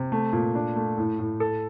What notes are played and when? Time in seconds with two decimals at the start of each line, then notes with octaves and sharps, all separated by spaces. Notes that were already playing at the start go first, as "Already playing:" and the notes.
Already playing: C3
0.12 A3
0.33 A#2
0.55 D4
0.76 A3
0.98 A2
1.19 A2
1.40 A4